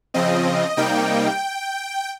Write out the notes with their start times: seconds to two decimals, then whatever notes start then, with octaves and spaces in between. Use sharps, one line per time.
0.14 C#3 F3 C4 D#5
0.77 C3 G3 A#3 D#4 G5